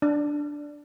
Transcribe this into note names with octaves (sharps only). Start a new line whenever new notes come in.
D4